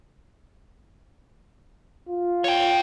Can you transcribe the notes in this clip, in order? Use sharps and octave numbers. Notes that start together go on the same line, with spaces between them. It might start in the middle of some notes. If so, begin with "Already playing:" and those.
F4
C#5 G5